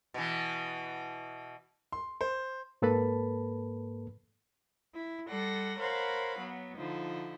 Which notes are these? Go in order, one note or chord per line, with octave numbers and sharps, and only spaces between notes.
B2 E3
C6
C5
G#2 A#3 A4 B4 A5 B5
E4
G3 A4 D5 F#5 C6 A#6
A#4 C5 C#5 F5 F#5 B5
F#3 B3
D3 F3 D#4 E4